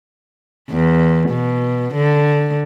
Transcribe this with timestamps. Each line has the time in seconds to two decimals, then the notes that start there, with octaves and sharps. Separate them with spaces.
0.70 E2
1.29 B2
1.94 D3